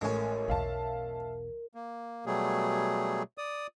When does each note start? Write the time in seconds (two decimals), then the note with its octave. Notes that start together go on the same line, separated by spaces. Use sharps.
0.01 A1 G#3 A3 C#4 A#4 G#5
0.48 B1 E2 E5 F5 A5
1.75 A#3
2.26 B2 F#3 G3 A3 G#4
3.38 D5 D#6